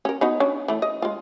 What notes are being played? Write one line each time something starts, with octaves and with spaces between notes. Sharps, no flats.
C#4 A#4
B3 D#4 F#4
C#4 D4
E3 A3
D#5
G#3 F4